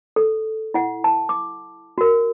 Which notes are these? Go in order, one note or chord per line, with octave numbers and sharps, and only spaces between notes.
A4
E4 F#5
A5
D6
F#4 A#4